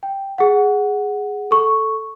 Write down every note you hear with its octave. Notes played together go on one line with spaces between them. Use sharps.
G5
G#4 F#5
A4 C#6